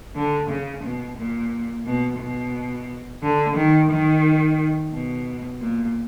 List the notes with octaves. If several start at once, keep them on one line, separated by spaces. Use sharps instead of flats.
D3
C#3
B2
A#2
B2
B2
D3
D#3
D#3
B2
A#2